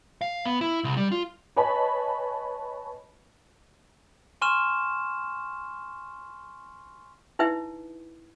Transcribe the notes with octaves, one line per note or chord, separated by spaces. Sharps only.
F5
B3
E4
C2
G3
F4
B4 C#5 D#5 G#5 A5 B5
G#5 C6 C#6 F6 E7
D#4 E4 B4 E5 G5